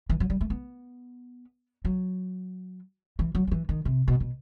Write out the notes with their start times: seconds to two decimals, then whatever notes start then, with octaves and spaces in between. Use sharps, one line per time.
0.10 E3
0.20 F#3
0.30 G3
0.41 A3
0.50 B3
1.85 F#3
3.19 E3
3.35 F#3
3.47 F#3
3.51 E3
3.69 D#3
3.85 C3
4.08 B2
4.20 B2